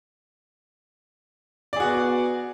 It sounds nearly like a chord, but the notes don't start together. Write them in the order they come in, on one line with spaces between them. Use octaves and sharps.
D5 G#4 F#4 B3